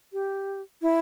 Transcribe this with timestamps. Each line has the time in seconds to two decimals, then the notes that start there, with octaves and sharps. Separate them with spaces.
0.13 G4
0.82 E4